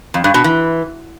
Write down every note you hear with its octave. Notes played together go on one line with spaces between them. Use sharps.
F2
G2
B2
E3